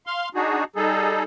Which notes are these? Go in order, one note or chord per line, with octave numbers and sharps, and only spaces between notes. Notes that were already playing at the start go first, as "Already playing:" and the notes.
F5 C6
D4 D#4 F#4 G#4
G3 D#4 G#4 A4